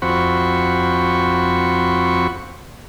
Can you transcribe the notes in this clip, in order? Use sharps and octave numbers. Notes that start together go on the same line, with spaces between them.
F2 C4 F#4 B5 C#6